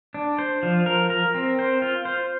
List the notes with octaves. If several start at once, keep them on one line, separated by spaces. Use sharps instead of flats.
D4
C5
F3
A#4
A#4
C4
C5
F4
C5